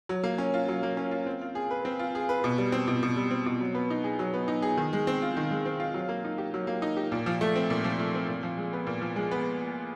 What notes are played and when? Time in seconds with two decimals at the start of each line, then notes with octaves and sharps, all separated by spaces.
0.09 F#3
0.24 A#3
0.38 C#4
0.54 F4
0.68 F#3
0.83 A#3
0.97 C#4
1.11 F4
1.27 C4
1.41 F4
1.55 G#4
1.71 B4
1.85 C4
1.99 F4
2.15 G#4
2.29 B4
2.44 B2
2.58 G3
2.72 C4
2.88 B2
3.03 B2
3.17 G3
3.31 C4
3.46 B2
3.61 F#3
3.75 B3
3.90 D#4
4.04 G#4
4.19 F#3
4.34 B3
4.48 D#4
4.62 G#4
4.77 D#3
4.93 G#3
5.07 C4
5.22 F4
5.37 D#3
5.51 G#3
5.66 C4
5.80 F4
5.94 F#3
6.09 A#3
6.24 D#4
6.38 G4
6.54 F#3
6.67 A#3
6.82 D#4
6.97 G4
7.12 A#2
7.26 F3
7.41 A3
7.56 C4
7.70 A#2
7.84 F3
7.99 A3
8.14 C4
8.28 A#2
8.43 F3
8.57 G#3
8.73 B3
8.87 A#2
9.01 F3
9.16 G#3
9.31 B3